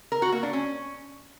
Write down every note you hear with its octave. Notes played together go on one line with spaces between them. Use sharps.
A#4
F#4
A#3
D4
C#4